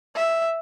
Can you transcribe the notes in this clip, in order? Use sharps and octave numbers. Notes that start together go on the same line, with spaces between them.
E5